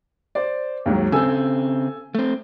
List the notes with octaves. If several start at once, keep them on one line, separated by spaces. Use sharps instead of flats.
C5 D5
D#2 G#2 F#3
C#3 C4 A4 G#5 E6
A3 C4